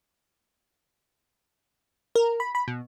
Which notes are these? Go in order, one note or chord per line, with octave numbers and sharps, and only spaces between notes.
A#4
B5
B5
B2